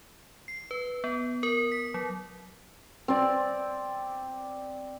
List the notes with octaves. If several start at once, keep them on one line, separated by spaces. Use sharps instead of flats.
C7
B4
B3
A#4
B6
F#3
C4 D5